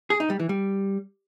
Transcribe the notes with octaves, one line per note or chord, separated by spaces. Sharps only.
G#4
D#4
G3
E3
G3